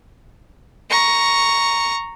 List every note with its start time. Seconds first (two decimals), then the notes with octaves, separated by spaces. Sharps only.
0.90 A#5 C#6